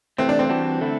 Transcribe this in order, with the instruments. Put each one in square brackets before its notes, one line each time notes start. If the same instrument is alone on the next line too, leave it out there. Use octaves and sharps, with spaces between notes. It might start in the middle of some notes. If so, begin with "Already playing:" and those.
[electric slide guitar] C3 E3 A3 [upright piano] C4
[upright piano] D4
C4
[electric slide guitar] E3 G3 D4 F#4
D3 A3 E4